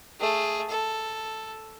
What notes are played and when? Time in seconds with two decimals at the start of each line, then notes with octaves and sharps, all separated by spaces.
0.20 A3 G#4
0.69 A4